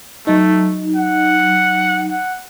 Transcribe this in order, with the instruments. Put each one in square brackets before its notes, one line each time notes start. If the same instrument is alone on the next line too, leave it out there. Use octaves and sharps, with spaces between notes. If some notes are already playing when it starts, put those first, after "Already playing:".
[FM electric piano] F#3 D#4 [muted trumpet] A3
[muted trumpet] F#5
F#5